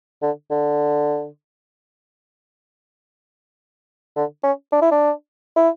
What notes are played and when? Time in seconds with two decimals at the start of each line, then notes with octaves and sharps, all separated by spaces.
0.22 D3
0.51 D3
4.16 D3
4.43 C#4
4.72 D4
4.82 E4
4.91 D4
5.56 E4